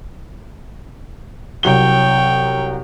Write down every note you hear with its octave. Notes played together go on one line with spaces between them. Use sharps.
C2 F#3 C#5 G5 G7